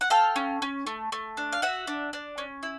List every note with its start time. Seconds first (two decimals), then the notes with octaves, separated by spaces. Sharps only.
0.01 F#5
0.10 A4 F5 G5
0.36 C#4
0.62 C#4
0.87 A3
1.12 A3
1.37 D4
1.52 F5
1.62 F#4 E5 F#5
1.87 D4
2.13 D4
2.38 C#4
2.63 E4